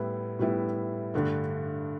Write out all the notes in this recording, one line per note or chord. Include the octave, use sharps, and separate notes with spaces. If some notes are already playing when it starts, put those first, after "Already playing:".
Already playing: A2 G3 B3 E4
A2 G3 B3 E4
G2 D3 A3 D4